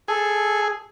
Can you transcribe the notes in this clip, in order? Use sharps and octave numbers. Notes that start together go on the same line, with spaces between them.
G#4 A4